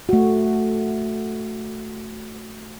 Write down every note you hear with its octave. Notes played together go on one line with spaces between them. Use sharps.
A3 F#4